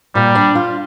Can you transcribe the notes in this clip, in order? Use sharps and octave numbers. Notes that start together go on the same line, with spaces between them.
A#2 G3
D4
F4